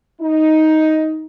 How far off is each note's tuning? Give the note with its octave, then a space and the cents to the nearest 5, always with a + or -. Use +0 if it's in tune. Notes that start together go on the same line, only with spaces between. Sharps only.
D#4 +10